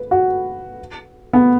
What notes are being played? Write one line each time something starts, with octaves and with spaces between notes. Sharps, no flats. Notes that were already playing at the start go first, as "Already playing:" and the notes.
Already playing: B4
F#4
B3